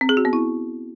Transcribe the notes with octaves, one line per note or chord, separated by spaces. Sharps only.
C4
G#4
F#4
B3
E4